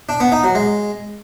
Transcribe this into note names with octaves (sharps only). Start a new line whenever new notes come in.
D4
B3
D#4
F#3
G#3